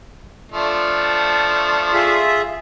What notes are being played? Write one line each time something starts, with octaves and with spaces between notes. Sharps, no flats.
F3 A3 D4
F4 G#4 E5